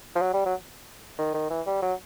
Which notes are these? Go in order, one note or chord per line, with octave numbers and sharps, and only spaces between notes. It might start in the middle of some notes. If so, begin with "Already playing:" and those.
F3
F#3
G3
F#3
D#3
D#3
E3
G3
F#3